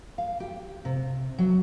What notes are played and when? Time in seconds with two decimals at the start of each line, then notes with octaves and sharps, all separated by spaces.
0.18 F5
0.40 G4
0.85 C3
1.38 F#3